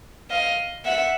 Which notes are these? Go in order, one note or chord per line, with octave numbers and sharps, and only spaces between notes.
D#5 F5
E5 F#5